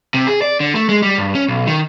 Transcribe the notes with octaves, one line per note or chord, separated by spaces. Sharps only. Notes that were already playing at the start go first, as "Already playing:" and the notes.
C3
G#4
D5
D3
A3
G#3
G3
G2
C#4
B1
D#3